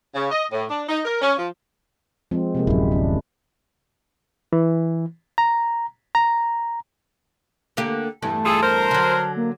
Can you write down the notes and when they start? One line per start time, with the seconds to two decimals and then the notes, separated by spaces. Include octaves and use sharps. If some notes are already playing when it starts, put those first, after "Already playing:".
0.14 C#3
0.31 D#5
0.52 A2
0.70 D4
0.89 D#4
1.05 A#4
1.21 C#4
1.38 F3
2.31 F3 G#3 C4
2.55 C3 G#3 A#3
2.67 D1 F#2 E4
2.91 D4
4.53 E3
5.38 A#5
6.15 A#5
7.77 D3 A#3 G4
8.22 E2 G2 A3 A5
8.45 F4 G#4 A4
8.62 A#4 C5
8.91 D3 F#3
9.36 A#3